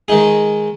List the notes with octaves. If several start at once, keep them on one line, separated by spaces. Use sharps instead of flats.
D#3 G#3 D#4 G#4